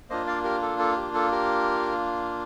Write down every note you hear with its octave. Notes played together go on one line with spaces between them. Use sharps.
A#3 D4 F4 C5 D#5
D5 F5
G4 A#4
A4
A4
G4
A4
G4 A#4